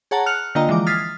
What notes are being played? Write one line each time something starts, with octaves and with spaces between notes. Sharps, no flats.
G#4 C#5 F#5 A5 A#5
F6 F#6 C#7 F7
D3 A#3 F4 D#5 G5 A#5
E3 F3 G#3 D6
D#6 F6 G#6 A6 B6 C7